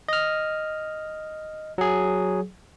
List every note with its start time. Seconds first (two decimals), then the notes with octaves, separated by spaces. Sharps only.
0.08 D#5 F6
1.78 F#3 G#4